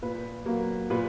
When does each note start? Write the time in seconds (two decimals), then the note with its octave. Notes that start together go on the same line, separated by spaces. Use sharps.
0.02 A#2 B4
0.45 F#3 A#3
0.90 A#2 B4